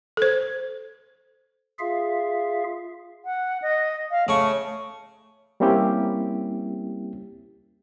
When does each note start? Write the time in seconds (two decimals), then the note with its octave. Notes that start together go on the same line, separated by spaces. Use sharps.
0.17 A4 C5
1.79 F4 G#4 E5 F5
3.25 F#5
3.62 D#5
4.11 F5
4.28 C#3 A3 C#6
5.60 G3 A#3 C4 C#4 E4 G4